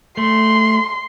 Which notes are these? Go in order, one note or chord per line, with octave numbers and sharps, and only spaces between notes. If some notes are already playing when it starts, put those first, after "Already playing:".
A3 C6